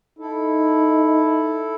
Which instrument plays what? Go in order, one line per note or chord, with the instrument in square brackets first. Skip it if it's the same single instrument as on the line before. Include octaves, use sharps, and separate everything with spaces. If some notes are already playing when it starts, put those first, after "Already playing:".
[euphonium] D#4 [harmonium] E4 A4